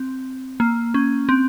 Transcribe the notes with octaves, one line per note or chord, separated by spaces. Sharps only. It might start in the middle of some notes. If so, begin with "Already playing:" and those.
Already playing: C4
A#3
C#4
C4